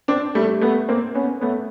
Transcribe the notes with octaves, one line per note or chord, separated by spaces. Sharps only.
C4 D4
G3 A3
A3 B3
A#3 C4
B3 C#4
A3 B3